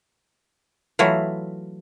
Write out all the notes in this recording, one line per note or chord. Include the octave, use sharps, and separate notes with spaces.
E3 F#3 A3 E4 F4